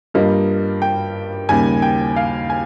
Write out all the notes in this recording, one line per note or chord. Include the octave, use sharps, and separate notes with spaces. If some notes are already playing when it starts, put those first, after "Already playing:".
G2 G3 A#3 F4 D#5
G5
D#2 C#3 G3 G#5
G5
F5
G#5